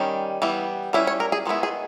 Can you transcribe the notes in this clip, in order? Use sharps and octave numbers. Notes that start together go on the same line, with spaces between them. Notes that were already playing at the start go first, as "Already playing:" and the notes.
Already playing: D#3 G3 C#4
E3 G3 B3
G3 C#4 E4 B4
C#5
A#4
G#4
D#3 G#3 B3 E4
G#4